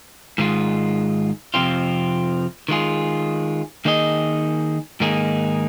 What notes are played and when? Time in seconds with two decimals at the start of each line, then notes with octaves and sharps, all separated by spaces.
0.38 G#2 D#3 G#3 F4
1.54 F2 C3 F3 C4 F4
2.69 D#3 G#3 F4 G#4
3.85 D#3 A#3 D#4 G#4 D#5
5.00 G#2 D#3 A#3 D#4 G#4